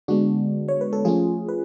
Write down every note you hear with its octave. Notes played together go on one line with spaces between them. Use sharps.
D3 G#3 B3 D4 F#4
C#5
B4
A4
F3 A3 C#4 F4 G#4
B4